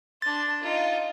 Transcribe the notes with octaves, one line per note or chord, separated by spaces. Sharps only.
D4 C6 A6
D#4 F4